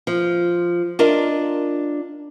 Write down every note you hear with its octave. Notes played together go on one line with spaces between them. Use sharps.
F3
D4 F4 A#4 D#5